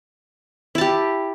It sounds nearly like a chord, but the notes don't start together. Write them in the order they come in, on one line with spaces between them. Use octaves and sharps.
E4 A5 G4